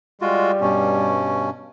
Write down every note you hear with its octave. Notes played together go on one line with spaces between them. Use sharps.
G3 G#3 F4 F#4
G2 B2 C#4